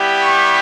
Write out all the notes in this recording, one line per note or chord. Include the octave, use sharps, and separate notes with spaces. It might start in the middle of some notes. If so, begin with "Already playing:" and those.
Already playing: G3 B3 E4 G4
C#6